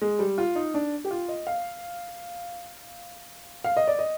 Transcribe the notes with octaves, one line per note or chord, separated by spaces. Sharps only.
G#3
G3
F4
D#4
D4
G4
F4
D#5
F5
F5
D#5
D5
D#5